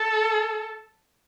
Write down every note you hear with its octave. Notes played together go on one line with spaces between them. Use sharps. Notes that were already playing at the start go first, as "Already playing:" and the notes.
Already playing: A4